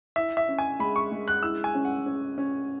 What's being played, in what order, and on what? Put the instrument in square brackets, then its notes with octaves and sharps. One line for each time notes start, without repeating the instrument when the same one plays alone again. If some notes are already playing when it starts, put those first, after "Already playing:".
[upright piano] E4 [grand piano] E5
[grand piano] E5
[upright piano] C#4
[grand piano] G#5
[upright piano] G#3 [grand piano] B5
[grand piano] C#6
[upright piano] G#3
[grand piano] F#6
[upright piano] E4 [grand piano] E6
[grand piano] G#5
[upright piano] C#4
[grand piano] F#5
[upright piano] C#4
C#4